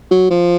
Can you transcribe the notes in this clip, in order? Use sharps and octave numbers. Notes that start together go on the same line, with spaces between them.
F#3
F3